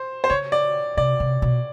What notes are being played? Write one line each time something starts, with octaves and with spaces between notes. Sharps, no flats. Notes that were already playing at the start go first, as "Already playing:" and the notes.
Already playing: C5
C5
C#3 C#5
D5
C3 D5
C3
B2